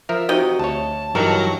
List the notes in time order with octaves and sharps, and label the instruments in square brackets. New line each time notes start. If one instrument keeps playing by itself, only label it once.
[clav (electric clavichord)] F3 A#4 A#5 [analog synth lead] E5
[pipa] C3 D#4 D#5 [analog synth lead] F#4
[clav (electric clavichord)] D2 C#5 [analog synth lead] A5
[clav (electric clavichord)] G2 E3 D#4 [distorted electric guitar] F#3 [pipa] A#4